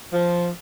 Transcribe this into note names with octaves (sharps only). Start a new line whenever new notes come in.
F3